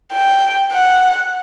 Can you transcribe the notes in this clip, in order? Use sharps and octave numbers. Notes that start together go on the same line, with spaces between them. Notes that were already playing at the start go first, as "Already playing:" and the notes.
G5
F#5